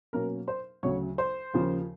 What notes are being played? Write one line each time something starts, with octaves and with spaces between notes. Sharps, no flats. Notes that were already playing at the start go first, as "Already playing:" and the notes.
B2 F#3 A#3 C#4 A#4 A#5
C5 C6
D2 C#3 F#3 C#5 C#6
C5 C6
D#2 C#3 F3